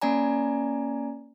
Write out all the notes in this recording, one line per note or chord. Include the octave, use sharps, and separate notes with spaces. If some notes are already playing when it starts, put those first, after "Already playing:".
A#3 C#4 D5 G#5 A#5